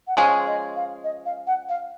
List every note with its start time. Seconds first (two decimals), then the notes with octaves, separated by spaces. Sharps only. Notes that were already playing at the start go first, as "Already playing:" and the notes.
0.07 F#5
0.17 F3 G#3 C#4 G#4 F5
0.46 D#5
0.76 F5
1.04 D#5
1.25 F5
1.47 F#5
1.69 F5